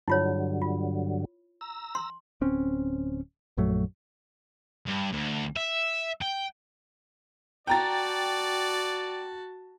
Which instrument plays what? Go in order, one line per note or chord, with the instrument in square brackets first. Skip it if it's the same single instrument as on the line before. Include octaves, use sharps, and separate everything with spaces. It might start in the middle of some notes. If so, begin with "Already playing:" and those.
[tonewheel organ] G2 D3 F#3 [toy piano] E4 F4 C#5
[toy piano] F4
[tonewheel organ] A#5 E6
[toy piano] C6
[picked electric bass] D1 C4 C#4
A#1 F#2 F#3 A3
[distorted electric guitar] G2
D2
E5
G5
[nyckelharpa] F#4 A5 [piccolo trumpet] D5 [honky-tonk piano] G5 A#5 A6